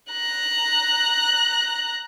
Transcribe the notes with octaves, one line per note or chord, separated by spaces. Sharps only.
A#5 F#6